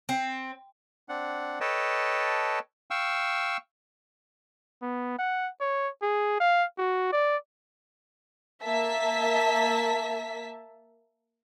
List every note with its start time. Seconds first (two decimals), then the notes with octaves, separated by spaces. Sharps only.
0.09 C4
1.09 C4 D4 F#5
1.61 A4 B4 C#5 D#5 G5 A5
2.91 F5 G5 C#6 E6
4.82 B3
5.18 F#5
5.60 C#5
6.02 G#4
6.40 F5
6.78 F#4
7.12 D5
8.63 A#3 E5 A5 B6